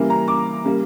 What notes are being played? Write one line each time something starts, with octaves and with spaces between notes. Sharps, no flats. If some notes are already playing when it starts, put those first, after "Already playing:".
Already playing: C#3 E3 G3 A#3
A#5
D6
C#3 G3 A#3